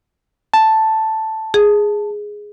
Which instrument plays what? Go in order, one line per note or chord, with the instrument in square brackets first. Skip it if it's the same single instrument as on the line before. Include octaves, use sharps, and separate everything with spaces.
[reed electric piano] A5
[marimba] G#4